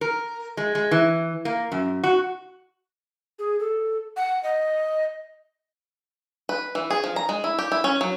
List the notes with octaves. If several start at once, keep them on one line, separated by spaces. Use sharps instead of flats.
A#4
G#3
G#3
E3
A#3
F#2
F#4
G#4
A4
F#5
D#5
B4
E3
G#4
F3
A#5
G#3
E4
G4
E4
C#4
F#3